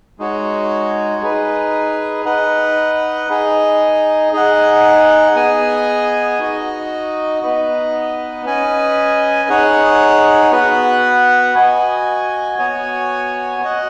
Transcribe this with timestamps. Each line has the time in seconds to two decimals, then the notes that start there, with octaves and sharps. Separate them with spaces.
0.19 G#3 D#4 F#4 C#5
1.22 D#4 G#4 B4
2.25 D#4 B4 D#5 F#5
3.29 D#4 G#4 D#5
4.33 D#4 G#4 D#5 F#5
5.35 B3 G#4 D#5 G#5
6.39 D#4 F#4 D#5
7.42 B3 D#4 B4 D#5
8.45 C#4 B4 D#5 G#5
9.49 D#4 G#4 C#5 F#5
10.52 B3 F#4 B4 F#5
11.56 F#4 D#5 G#5
12.58 B3 F#4 C#5 G#5
13.61 F#4 D#5 F#5